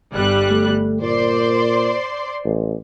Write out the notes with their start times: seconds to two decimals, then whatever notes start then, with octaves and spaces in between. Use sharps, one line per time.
0.13 G1 G3 F#6
0.50 A3
1.02 A#2 C5 D5 C6
2.45 A1